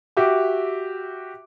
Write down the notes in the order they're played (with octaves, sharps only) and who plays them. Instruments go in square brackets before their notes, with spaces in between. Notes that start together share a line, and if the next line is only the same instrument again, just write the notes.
[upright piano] F#4 G4 E5 D6